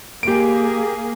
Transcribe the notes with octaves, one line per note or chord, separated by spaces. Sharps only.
A#3 G4 G#4 D7